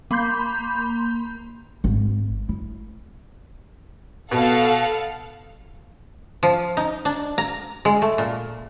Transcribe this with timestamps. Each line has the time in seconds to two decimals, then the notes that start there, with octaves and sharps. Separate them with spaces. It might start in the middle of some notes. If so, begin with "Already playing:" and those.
0.11 A#3 B5 C6 G6
1.84 G#1
2.49 E4
4.31 B2 A4 F5 F#5
6.43 F3
6.77 D#4
7.05 D4
7.38 A#5
7.85 G#3
8.02 A3
8.18 A#2